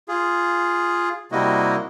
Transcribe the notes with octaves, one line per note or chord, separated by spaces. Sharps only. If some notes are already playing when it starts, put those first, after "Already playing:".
F4 G#4
C3 G3 A#3 E4 F#4 D#5